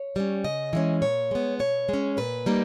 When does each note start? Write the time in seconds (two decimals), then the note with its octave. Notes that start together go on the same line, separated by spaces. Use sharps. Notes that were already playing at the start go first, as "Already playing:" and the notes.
Already playing: C#5
0.16 G3 C#4
0.44 C#3 D#5
0.73 E3 G#3 C#4
1.02 A#2 C#5
1.31 G#3 B3
1.59 B2 C#5
1.89 G#3 C#4
2.17 A#2 B4
2.46 G3 A#3 D#4